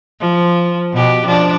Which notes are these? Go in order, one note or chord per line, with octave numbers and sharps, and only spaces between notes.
F3
B2 G4
F3 D4